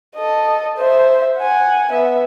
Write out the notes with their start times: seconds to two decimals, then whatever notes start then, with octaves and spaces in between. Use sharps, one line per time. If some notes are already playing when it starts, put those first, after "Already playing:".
0.15 A4 D#5
0.78 C5 E5
1.38 F#5 G#5
1.92 B3 E5